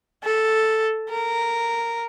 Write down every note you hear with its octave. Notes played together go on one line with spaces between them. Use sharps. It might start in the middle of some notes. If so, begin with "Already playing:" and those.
A4
A#4